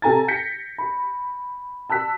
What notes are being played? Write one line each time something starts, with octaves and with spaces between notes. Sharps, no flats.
C3 A4 G#5 A#5 A6
G6 A#6 B6 C#7
B5
A5 E6 F#6 B6